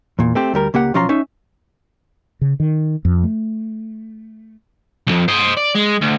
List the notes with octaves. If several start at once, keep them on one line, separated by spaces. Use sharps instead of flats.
E2 A#2
A3 C4 G4
D2 G3 A#4
C#2 A#3 G4 F#5
B1 F3 C#4 F4 A#5 C6
C#4 D#4 E5
C#3
D#3
F2
A3
B1 F2
C5 D#5
D5
G#3
D2